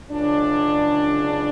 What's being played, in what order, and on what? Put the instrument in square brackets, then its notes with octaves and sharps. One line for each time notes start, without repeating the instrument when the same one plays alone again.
[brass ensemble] C#2 C#3 F#3 D4